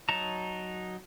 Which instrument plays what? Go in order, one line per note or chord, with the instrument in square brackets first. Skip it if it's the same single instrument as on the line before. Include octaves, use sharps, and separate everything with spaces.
[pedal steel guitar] F#3 D#4 A5 A#5